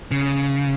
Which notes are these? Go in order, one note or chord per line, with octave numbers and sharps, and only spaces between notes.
C#3